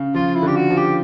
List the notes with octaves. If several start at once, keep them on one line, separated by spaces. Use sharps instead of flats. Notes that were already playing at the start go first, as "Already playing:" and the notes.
Already playing: C#3
F3 F4
E4
D3 G4
F#4
F3
G4